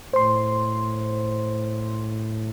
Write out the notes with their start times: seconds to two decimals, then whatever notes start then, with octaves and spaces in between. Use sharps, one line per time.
0.13 A2 C5 C6